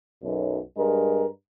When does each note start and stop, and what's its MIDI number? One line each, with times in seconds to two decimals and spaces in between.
0.23 0.58 35
0.23 0.58 42
0.23 0.58 47
0.76 1.24 43
0.76 1.24 56
0.76 1.24 70